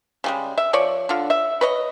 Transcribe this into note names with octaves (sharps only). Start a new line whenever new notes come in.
C#3 G3 G#3
E5
F3 C#5 D5
D3 F4
E5
B4 C#5 D#5